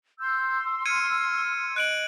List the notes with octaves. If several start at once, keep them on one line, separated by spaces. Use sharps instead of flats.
C6 E6 G6
F6 G#6 C#7 D#7
D#5 F#6 D7 F#7